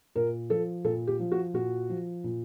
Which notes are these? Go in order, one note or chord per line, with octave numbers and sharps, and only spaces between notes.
A#2 A#4
F3 A4
A#2 A4
G4
F3
F#4
A#2 F#4
F3
A#2